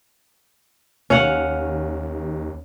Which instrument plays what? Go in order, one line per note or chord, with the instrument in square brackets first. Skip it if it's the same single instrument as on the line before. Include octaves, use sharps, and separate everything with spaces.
[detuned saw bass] D#2 [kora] C#4 F5 F#5